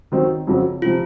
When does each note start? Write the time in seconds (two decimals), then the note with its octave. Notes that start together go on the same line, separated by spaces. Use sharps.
0.12 D#3 F#3 C4 D#4 F#4
0.47 F2 C#3 F#3 C4
0.82 C3 F3 F4